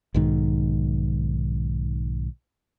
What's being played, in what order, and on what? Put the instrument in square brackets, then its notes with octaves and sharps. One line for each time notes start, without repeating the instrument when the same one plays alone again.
[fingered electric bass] B1 G#2 D#3